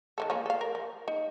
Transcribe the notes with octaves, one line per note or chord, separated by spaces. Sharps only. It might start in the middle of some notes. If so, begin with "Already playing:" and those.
D#3 E3 A4
F3 A#3 C#4
A4 F5
A#4
F3
D#4